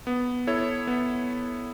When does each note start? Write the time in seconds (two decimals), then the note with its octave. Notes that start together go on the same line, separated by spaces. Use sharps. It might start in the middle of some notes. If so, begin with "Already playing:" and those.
0.07 B3
0.47 E4 A4 C#5
0.87 B3